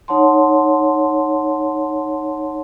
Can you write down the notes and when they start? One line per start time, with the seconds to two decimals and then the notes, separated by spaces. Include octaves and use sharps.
0.08 D#4 C#5 F#5 A5 C6